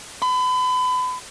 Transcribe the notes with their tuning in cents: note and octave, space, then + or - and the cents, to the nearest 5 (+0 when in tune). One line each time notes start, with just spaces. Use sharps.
B5 +35